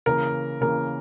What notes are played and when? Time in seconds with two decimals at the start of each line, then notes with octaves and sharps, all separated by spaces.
0.06 C#3 E3 A#3 A#4
0.61 C#3 E3 A#3 A#4